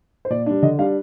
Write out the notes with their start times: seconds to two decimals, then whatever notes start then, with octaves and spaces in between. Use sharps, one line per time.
0.25 C5
0.30 A#2 D5
0.46 G3 D4
0.63 D3 D#5
0.78 G3 D4 F5